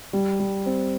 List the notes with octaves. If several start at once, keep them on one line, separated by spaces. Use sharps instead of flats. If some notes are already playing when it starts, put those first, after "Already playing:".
G3
G3
C4